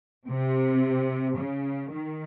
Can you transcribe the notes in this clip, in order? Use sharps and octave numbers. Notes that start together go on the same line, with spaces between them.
C3
C#3
D#3